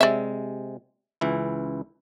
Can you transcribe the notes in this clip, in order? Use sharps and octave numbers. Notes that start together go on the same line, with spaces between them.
C3 G#3 D5 E5
C#2 E3 E4